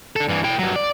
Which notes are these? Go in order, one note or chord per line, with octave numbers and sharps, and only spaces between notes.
D4 A4
G2 E3
E4 G5
G2 F#3
D5